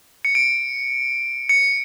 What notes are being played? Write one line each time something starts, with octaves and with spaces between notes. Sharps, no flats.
C#7
D7
C#7